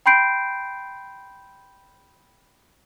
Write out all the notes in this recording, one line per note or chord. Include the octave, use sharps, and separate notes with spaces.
G5 B5 C6 G6 C7 D7